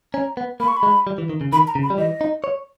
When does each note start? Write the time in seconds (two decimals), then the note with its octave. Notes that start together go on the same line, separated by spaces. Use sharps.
0.14 C#4 A#5
0.37 B3
0.60 A#3 B5
0.68 C#6
0.77 B5
0.83 G#3
1.07 G3
1.18 E3
1.29 D#3
1.41 C#3
1.53 D#3 B5
1.68 A#5
1.75 C#3
1.83 B5
1.90 G3
1.98 E3 D#5
2.21 D#4
2.44 C#5